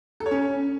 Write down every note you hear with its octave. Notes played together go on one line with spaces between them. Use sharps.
A4
C#5
C#4